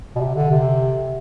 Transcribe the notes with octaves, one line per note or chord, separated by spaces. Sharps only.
B2
C3
D3
C3